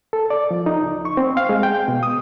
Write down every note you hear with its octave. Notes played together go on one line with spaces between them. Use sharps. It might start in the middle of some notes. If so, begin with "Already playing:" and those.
A4
D5
F3
D#4
C#2
C#6
C4
F5
G#3
G5
B2
D#6